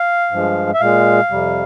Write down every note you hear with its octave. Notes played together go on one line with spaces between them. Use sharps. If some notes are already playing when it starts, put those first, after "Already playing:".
Already playing: F5
G2 F3 G#3
E5
A#2 G#3 F5
F2 C3 G3